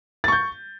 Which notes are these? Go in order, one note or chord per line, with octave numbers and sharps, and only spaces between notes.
C#6 G6 A6